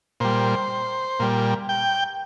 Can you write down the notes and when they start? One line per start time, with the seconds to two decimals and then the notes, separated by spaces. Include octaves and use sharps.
0.20 A#2 G3 C5
1.20 A#2 G3
1.69 G5